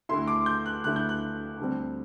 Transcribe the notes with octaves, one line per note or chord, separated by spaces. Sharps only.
D2 D3 A3 E4 C6
D6
G6
F#6
D2 D3 A3 E4 F#6
G6
F#6
D2 D3 G3 C4